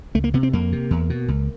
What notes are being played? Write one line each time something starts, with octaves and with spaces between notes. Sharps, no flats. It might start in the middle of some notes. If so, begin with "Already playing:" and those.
C#2 A3
A#3
C3 B3
C4
F2 A#3
C3
E2
B2
C#2